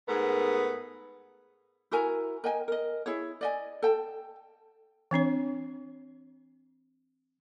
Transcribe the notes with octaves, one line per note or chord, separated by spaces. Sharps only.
G#2 A3 B3 G#4 A#4
E4 F#4 A#4 G#5
A#4 D#5 G5 G#5
A#4 D#5
E4 G#4 C#5
D5 D#5 G#5
A4 G5 A5
E3 C4 D4 C#5